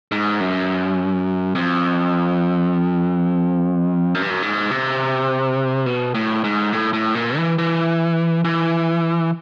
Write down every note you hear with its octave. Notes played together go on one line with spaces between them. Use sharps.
G#2
F#2
F2
F#2
G2
F#2
G#2
C3
B2
A2
G#2
A2
A2
A#2
E3
E3
E3